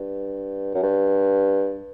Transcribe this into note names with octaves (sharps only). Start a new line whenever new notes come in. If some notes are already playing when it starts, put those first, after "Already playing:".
Already playing: G2
F#2
G2